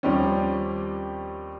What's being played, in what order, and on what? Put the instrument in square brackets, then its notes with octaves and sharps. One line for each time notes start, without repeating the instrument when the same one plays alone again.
[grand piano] D#2 F3 G3 C4 C#4